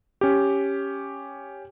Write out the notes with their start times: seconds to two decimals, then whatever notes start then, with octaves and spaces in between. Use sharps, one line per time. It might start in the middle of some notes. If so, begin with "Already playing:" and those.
0.21 C#4 G4